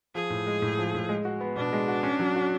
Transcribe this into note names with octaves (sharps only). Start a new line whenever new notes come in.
F3 G#4
A2
G#3
A2
F3
A2
G#3
F#4
B3
B2 D4
G#3
F#4
C#4
F#3
F#4